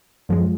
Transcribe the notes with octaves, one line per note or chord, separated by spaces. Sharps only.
F#2 F3 G#3